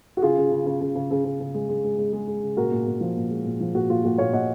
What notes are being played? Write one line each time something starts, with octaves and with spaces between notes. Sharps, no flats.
F#4
C#3 F4 G#4
C#3
C#3
C#3
C#3
C#3
C#3
C#3
C#3
G#3
G#3
G#3
G#3
G#3
G#3
C#3
A#2 F#4 A#4
A#2
A#2
F3
A#2
G#3
A#2
F3
A#2 F#4
A#2 F4
A#2 F#4
A#2 C#5 F5
A#2 D#5 F#5